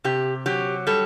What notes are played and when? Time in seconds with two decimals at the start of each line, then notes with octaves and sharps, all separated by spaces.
0.04 C3 G4
0.46 F#3 G4
0.87 G3 A4